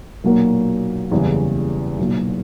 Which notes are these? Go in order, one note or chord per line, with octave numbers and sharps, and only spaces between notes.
B1 A#2 F#3 A#3
F#1 E2 C#3 E3 G3
B1 A#2 F#3